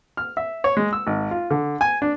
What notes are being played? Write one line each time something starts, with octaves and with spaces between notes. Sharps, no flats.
F6
E5
C#5
G#3
E6
G#1
F4
D3
G#5
D4